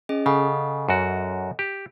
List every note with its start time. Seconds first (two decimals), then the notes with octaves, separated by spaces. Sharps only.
0.09 C#4 G#4 D#5
0.26 C#3 A4 D#5 F#5
0.89 F#2 F#4
1.59 G4